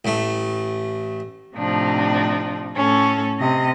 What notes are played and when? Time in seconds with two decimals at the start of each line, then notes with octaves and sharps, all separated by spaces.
0.05 A1 A3
1.55 A2 C3 F3 D4 D#4
2.76 A2 C#4 A4
3.39 C3 D#5